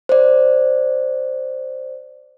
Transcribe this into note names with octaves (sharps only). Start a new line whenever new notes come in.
C5 D5